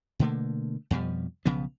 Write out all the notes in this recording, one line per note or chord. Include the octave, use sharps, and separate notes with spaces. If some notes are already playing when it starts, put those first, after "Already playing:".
B2 D3 A3 A#3
F2 B2 F3 G3
B1 C#3 F3 B3